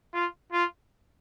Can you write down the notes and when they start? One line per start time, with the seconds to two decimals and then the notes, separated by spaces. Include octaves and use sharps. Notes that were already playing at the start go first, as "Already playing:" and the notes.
0.14 F4
0.53 F4